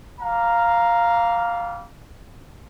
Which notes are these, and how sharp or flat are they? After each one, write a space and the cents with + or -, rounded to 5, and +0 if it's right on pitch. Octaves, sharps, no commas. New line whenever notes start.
G3 -25 F5 +0 A#5 +0